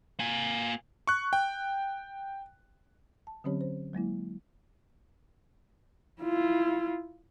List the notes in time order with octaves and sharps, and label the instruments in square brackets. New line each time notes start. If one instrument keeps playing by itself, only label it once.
[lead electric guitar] A#3 G#5
[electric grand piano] C#6 F#6
G5
[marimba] A5
D3 F#3 C4 C#4 G4 C#5
C5
F#3 G#3 A#3 E4
[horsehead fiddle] E4 F4